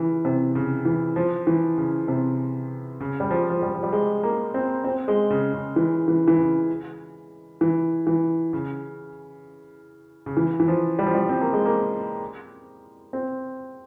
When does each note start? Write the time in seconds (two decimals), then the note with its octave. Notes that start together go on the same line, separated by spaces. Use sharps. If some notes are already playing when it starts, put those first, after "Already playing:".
Already playing: C#3 E3
0.25 C3
0.55 C#3
0.85 E3
1.16 F3
1.47 E3
1.78 C#3
2.08 C3
3.01 C#3
3.20 G3
3.31 F3
3.50 F3
3.62 G3
3.74 F3
3.83 G3
3.92 G#3
4.23 A#3
4.54 C4
4.84 C4
5.08 G#3
5.30 C#3
5.54 C#3
5.76 E3
6.08 E3
6.28 E3
6.38 C#3
7.61 E3
8.07 E3
8.53 C#3
10.26 C#3
10.37 E3
10.60 E3
10.68 F3
10.99 G3
11.06 F3
11.14 G3
11.29 C4
11.41 A#3
11.53 G#3
11.66 A#3
13.13 C4